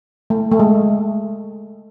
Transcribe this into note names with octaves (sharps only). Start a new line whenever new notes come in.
A3
A3
G#3